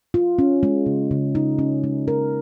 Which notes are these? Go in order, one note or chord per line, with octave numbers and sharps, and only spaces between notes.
F4
C#4
G#3
C#3
C#3
D#4
C#4
G#3
A#4